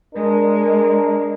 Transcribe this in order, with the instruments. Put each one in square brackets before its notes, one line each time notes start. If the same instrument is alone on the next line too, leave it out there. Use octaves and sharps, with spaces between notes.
[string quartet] G#3 [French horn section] D4 A#4